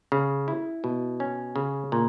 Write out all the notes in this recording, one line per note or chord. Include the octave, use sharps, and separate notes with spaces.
C#3
E4
B2
C#4
C#3
A#2